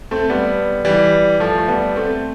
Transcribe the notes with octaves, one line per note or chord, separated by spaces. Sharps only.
A3 C4
G3 B3
E3 G3
F3 A3
A3
G3 B3
A3 C4